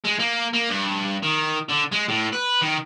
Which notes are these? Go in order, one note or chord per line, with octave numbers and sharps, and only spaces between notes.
G#3
A#3
A#3
G2
D#3
D3
G#3
A2
B4
D#3